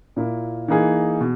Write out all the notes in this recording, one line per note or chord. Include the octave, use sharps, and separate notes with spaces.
A#2 A#3 E4
E3 A#3 D#4 G#4
B2